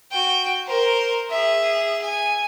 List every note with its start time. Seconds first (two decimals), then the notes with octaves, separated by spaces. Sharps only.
0.12 F#4 G5
0.67 A#4 C5
1.30 G#4 E5
2.02 G#5